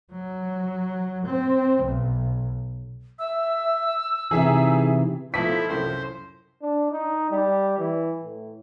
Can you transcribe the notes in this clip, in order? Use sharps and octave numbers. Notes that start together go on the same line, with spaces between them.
F#3
C4
B1
E5 E6
C3 E3 D#4 G#4 E5
F3 A3 B3 D#4 E4 A4 B6
C2 F#2 A2 C5
D4
D#4
G3
E3
A2